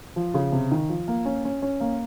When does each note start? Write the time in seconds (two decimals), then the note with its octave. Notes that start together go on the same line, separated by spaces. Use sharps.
0.16 F3
0.34 C#3
0.52 C3
0.71 D#3
0.89 F3
1.08 A#3
1.25 C#4
1.45 C#4
1.62 C#4
1.80 A#3